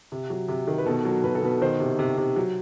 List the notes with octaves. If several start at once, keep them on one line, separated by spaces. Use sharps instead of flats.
C3
F#3
C3
D#3
B4
B2 A4
F#3
B2 B4
A4
B2 B4
D#3 C5
C3
C3
C3
F#3